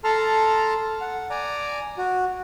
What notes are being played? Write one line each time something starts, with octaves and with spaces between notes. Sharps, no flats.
A4 A5 A#5 C6 F6
F#5
D5 G#5 A#5
F#4